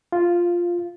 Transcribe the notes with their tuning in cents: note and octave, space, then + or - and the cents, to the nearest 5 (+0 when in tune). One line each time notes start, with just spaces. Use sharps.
F4 +0 F5 -15